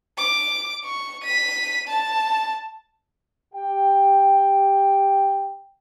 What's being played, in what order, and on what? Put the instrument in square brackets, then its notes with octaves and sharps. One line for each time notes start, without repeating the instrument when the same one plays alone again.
[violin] D6
C#6
B6 D#7
A5
[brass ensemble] G4 G5